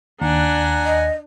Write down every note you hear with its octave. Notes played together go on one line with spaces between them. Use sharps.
D#2 D4 F#5 G#5 A#5
D#5